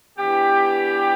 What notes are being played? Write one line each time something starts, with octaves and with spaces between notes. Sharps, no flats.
E3 B3 D4 G4